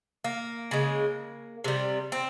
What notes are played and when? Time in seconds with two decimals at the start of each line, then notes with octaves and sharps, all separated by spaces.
0.24 A#3
0.71 C#3 G#3
1.64 C3 G3
2.12 C4